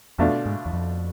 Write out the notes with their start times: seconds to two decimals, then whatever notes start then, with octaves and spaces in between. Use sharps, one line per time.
0.18 F2 B2 A3 D4 F4
0.46 G#2
0.66 E2
0.73 F2